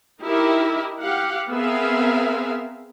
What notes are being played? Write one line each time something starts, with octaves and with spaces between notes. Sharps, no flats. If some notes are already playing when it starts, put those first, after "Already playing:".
D#4 E4 G4 A#4 E5
G4 F5 F#5
B3 C4 G#4 A#4 E5 F5